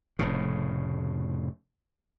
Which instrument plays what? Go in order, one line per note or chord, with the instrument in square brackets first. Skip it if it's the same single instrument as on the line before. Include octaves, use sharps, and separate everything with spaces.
[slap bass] F1 A2 C#3